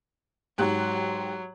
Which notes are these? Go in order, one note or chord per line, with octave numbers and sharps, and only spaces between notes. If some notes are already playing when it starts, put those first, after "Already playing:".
G#2 F#3 G4 F#6